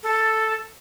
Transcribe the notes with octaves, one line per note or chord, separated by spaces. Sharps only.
A4